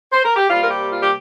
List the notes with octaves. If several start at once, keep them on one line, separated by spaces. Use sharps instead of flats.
C5
A#4
G4
C3 G3 A#3 F4
A#4
G4
F4
G4